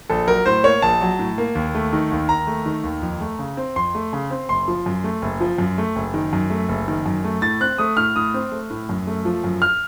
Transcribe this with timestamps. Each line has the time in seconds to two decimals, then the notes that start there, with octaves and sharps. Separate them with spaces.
0.10 A#1 A4
0.28 F#3 A#4
0.46 A2 C5
0.64 A#3 C#5
0.82 A#1 A5
1.01 F#3
1.19 A2
1.38 A#3
1.55 D#2
1.75 A3
1.93 D#3
2.11 D#2
2.29 D#2 A#5
2.47 A3
2.66 D#3
2.84 D#2
3.02 F2
3.21 A3
3.39 C#3
3.57 C4
3.76 F2 C6
3.95 A3
4.13 C#3
4.31 C4
4.49 F#1 C6
4.68 F3
4.86 F#2
5.04 A3
5.22 F#1
5.40 F3
5.58 F#2
5.78 A3
5.96 F#1
6.14 D#3
6.33 F#2
6.50 A3
6.69 F#1
6.88 D#3
7.06 F#2
7.24 A3
7.42 A2 A6
7.61 C4 F#6
7.78 A3 D#6
7.97 A2 F6
8.16 A2 D#6
8.34 C4
8.52 A3
8.70 A2
8.89 F#2
9.07 A3
9.25 F3
9.44 F#2
9.62 F6